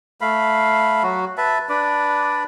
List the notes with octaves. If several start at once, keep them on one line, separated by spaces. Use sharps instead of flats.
A3 F5 B5
F#3 F#4
B4 E5 A5
D4 B4 D5